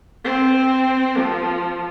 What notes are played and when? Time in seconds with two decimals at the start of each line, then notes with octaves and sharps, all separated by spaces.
0.24 C4
1.18 F3